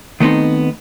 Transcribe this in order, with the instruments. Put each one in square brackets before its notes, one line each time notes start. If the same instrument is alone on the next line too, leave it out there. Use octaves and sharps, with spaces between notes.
[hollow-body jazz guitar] D#3 A3 B3 C4 D#4